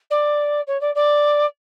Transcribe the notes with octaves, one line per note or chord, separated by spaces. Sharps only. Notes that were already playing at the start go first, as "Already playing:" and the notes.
D5
C#5
D5
D5